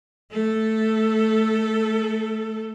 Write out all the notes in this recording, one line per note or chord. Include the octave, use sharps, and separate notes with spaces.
A3 A4